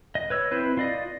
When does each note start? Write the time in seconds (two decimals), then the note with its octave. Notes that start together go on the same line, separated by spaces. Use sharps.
0.15 D#5
0.30 B4 C#5 E6
0.51 C4 E4 B4 C5
0.77 F4 D5 D#5